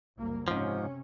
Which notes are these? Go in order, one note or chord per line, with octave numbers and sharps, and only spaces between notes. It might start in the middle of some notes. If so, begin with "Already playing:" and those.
F#1 C2 A#3
G#2 C3 F3 C#4